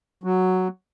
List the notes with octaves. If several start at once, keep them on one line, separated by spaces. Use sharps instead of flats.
F#3